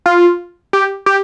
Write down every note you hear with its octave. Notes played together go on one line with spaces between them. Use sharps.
F4
G4
G4